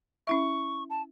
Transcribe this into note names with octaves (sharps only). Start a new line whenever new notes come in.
C#4 E4 E5 C#6
A5